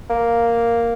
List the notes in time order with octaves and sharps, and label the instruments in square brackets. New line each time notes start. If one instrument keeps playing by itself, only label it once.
[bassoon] A#3